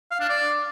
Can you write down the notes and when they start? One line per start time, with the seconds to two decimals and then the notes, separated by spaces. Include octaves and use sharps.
0.11 F5
0.20 D4
0.29 D5